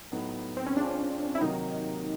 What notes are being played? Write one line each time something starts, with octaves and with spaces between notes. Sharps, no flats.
A2 F#3 B3 D#4
C4
C#4
G#3 C4 D4 F4
E4
C3 D#3 F#3 A#3 D#4